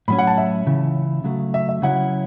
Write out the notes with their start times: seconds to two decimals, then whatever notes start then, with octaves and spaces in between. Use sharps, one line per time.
0.08 A2 F#3 C#4 B5
0.19 F#5
0.27 A5
0.38 E5
0.66 C#2 C#3 E3
1.24 C#3 F#3 A3
1.54 E5
1.69 E5
1.82 C#3 F#3 C#4 E4 F#5